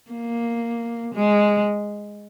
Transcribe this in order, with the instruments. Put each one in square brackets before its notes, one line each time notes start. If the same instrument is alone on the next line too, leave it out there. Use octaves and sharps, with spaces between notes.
[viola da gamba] A#3
G#3